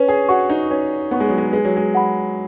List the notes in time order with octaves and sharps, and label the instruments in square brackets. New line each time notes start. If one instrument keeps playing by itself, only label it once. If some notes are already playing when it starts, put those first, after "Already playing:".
Already playing: [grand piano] C#4 [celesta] B4
[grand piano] G#4
[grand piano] F#4 [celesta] F#5 C#6
[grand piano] D#4
[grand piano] C#4 [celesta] B4
[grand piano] B3 [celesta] F#5 C#6
[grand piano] G#3
F#3
G#3
[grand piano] G#3 [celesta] B4
[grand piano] F#3
G#3
[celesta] F#5 B5